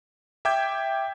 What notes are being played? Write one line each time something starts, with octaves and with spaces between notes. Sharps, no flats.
E5 G5 D6 G6 G#6